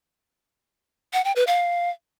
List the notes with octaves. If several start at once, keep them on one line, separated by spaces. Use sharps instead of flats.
F#5
G5
B4
F5